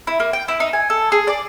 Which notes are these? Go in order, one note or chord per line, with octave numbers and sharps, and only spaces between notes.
E4
A#3
G5
E4
D#4
G#5
A4
G#4
D5